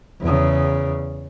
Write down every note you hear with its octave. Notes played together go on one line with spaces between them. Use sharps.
E2 C#3